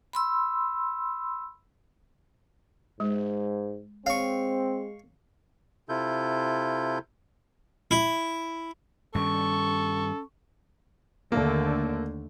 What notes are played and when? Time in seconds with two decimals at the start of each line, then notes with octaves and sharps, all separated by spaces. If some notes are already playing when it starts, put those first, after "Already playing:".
0.13 B5 C6 E6
3.00 G#2 G#3
4.06 G#3 C4 C#5 F5 C#6
5.89 C3 E4 F4 A4 G6
7.91 E4
9.15 G2 D#3 G3 C#4 A4 C#6
11.32 D#2 D3 A3 A#3